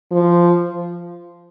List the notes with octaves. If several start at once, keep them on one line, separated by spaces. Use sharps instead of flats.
F3